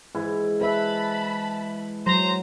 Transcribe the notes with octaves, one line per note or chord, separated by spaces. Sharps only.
G#2 E3 E4
B4 E5 A5 B5
F#3 C5 A#5